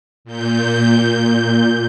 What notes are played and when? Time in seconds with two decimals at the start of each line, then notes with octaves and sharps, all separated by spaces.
0.25 A#2 G6